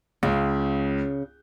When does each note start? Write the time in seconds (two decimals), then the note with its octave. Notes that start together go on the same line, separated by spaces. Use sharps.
0.23 C#2 C#3